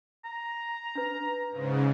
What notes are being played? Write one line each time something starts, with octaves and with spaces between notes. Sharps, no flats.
A#5
D4 B4
G#2 C#3